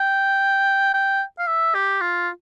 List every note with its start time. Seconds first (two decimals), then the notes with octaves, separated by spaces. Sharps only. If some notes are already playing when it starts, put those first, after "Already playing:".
Already playing: G5
0.94 G5
1.39 F5
1.47 E5
1.74 G4
2.01 F4